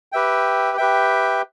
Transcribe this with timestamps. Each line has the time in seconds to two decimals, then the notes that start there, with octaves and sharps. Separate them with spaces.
0.12 G4 B4 E5 G5
0.77 G4 B4 E5 G5